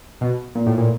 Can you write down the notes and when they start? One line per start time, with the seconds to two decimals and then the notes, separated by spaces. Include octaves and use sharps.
0.21 B2
0.55 A#2
0.66 A2
0.78 A#2